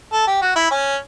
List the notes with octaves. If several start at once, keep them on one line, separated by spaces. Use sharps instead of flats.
A4
G4
F#4
E4
C#4